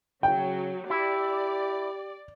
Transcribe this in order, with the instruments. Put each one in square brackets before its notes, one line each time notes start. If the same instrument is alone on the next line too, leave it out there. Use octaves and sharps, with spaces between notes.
[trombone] C#3 [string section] F#3 [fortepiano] G5
[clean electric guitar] E4 [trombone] G4 [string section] D5